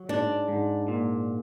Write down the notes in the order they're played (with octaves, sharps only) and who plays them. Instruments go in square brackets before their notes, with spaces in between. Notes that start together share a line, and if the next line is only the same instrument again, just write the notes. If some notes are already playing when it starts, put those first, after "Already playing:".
Already playing: [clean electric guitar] F#3
[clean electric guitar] G#2 [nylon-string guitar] D4
[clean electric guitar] G#2
A#2